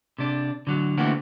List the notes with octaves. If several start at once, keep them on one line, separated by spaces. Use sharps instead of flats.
C3 D4
D3 F#3
D3 E3 A3 A#3 C4 F#4